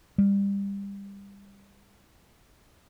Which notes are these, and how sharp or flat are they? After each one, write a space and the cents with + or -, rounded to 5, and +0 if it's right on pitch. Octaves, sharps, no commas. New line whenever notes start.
G3 +25